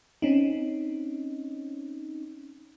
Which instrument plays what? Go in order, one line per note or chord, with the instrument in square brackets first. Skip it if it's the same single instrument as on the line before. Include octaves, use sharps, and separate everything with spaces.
[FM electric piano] C4 C#4 D#4